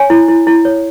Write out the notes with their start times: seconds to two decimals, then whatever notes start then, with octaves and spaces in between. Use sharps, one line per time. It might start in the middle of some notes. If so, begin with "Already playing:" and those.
Already playing: C#5 G#5
0.10 E4
0.28 E4
0.47 E4
0.65 C#5